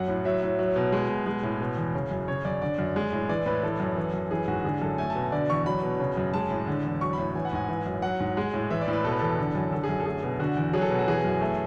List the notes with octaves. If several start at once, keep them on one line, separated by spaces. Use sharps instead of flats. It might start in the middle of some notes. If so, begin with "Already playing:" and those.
Already playing: F#2 F#3 F#5
A2
F#3 E5
A2
F#3
B2
G#3
B2
G#3
A2
B2
E2
C#3
F#2
C#3 C#5
F#2 D5
D3 D5
F#2
G#3
A2
E3 D5
A2 B4
E3 A4
F#2
E3
F#2
E3 G#4
G#2 F#4
D3 G#4
F#2 A4
A3 G#5
A5
B2
D3 D5
E2 C#6
F#3 B5
B2
C#3
F#2
G#3 A5
A2
D3
E2
F#3 C#6
A2 B5
E3 G#5
F#5
G#2 G#5
E3
F#2
F#3 F#5
G#2
G#3
A2
E3 E5
D5
A2
B4
B2 A4
B4
E2 A4
D3
F#2
D3 A4
G#4
F#2
A4
A3 G#4
B2
D3 F#4
E2
F#3 G#4
A4
B2
F#4
E3 G#4
F#2
A3